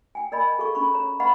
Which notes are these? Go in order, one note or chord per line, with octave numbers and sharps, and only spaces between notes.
G5 G#5
A#4 D5 D#5 G#5 B5
G#4 A4 F5 C#6
C#4 B5 C#6
C#5 A#5
B4 D#5 F5 F#5 B5 C#6